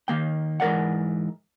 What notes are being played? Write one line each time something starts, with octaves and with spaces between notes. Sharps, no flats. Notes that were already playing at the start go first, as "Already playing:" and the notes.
D#3 A#3 G5
G#2 E3 A#4 D5 F#5